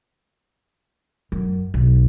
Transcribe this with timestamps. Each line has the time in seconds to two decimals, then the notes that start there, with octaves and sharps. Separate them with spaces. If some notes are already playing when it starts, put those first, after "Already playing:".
1.32 F#2
1.74 B1